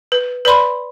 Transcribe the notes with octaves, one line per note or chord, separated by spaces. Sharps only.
B4
B4 D5 B5 C6